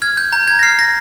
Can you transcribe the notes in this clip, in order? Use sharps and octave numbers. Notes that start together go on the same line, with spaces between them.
F6 G#6
G6
A#5 G6
G#6
A#6
F6 C7
A#6